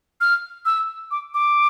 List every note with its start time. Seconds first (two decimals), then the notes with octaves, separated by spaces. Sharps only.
0.21 F6
0.65 E6
1.11 D6
1.34 D6